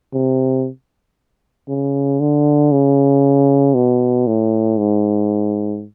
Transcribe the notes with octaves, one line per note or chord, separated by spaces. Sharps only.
C3
C#3
D3
C#3
B2
A2
G#2